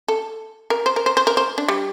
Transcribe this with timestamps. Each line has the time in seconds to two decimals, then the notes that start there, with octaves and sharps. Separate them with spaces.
0.08 A4
0.70 A#4
0.86 C5
0.96 A#4
1.06 C5
1.17 C5
1.27 A#4
1.37 C5
1.58 D4
1.68 G3